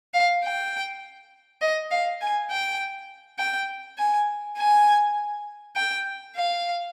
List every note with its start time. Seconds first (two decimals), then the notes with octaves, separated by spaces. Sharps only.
0.14 F5
0.44 G5
1.61 D#5
1.91 F5
2.21 G#5
2.50 G5
3.39 G5
3.98 G#5
4.57 G#5
5.76 G5
6.36 F5